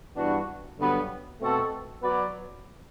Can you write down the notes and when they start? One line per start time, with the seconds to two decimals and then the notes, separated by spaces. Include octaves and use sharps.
0.16 G2 E3 B3 D4 F#4
0.78 G2 D3 F#3 B3
1.40 B2 A3 C4 F#4 A4
2.02 F#3 B3 F#4 B4 D5